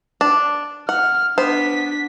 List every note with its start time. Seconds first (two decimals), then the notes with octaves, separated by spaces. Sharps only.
0.21 D4
0.89 F#5 F6
1.38 B3 D4 C5 B6